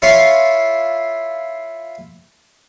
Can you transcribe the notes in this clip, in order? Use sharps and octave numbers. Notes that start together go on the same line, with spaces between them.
E4 F4 C#5 C6